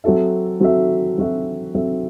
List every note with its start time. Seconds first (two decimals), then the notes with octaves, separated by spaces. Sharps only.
0.04 F#3 C4 F#4 A4 E5
0.60 F#3 C4 F#4 A4 E5
1.18 F#3 C4 F#4 A4 E5
1.74 F#3 C4 F#4 A4 E5